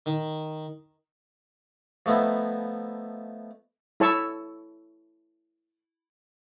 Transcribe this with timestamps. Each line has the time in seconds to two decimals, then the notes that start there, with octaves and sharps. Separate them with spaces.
0.06 D#3
2.06 F3 A3 B3 D#4 E4
4.00 E4 A4 C#5 A5 C#6 E6